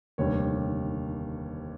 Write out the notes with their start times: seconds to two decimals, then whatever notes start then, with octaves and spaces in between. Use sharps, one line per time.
0.18 F1 D#2 D3 G3 C#5